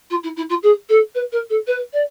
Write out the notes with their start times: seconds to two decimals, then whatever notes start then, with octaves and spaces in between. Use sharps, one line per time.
0.10 F4
0.23 E4
0.37 E4
0.49 F4
0.63 G#4
0.89 A4
1.15 B4
1.32 A#4
1.50 A4
1.67 B4
1.93 D5